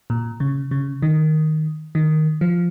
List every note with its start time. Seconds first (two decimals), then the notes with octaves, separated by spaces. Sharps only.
0.10 A#2
0.40 C#3
0.71 C#3
1.02 D#3
1.95 D#3
2.41 F3